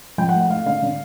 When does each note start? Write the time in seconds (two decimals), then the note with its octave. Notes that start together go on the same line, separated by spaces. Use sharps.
0.18 F3 G5
0.29 F#5
0.34 A3
0.41 F#5
0.50 A3 F5
0.66 D3 F5
0.82 D3